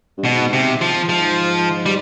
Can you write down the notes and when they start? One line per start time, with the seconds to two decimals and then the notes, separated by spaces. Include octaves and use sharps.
0.18 G2
0.25 G#2 B2
0.53 C3
0.81 F3
1.09 G#2 F3
1.86 G3